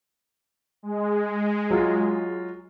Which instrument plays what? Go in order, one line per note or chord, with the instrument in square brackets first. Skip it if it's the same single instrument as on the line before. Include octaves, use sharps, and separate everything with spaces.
[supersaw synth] G#3
[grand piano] F#3 F4